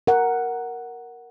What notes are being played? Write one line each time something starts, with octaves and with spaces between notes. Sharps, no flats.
A#4 F#5